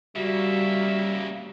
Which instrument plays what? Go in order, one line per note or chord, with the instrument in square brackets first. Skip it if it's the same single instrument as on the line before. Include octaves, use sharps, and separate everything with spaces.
[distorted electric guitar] C#3 A#3 [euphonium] G3 [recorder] F#4 [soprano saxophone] E5